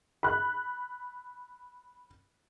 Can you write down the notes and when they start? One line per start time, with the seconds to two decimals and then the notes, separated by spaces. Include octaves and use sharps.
0.23 B5 F#6